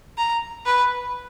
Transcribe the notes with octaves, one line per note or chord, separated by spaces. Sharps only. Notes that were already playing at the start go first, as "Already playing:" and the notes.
A#5
B4